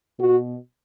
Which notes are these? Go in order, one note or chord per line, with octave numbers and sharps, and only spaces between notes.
B2 F#4